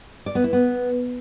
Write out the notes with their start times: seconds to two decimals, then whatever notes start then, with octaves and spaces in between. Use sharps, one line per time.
0.26 D5
0.35 B3
0.44 E4
0.53 B3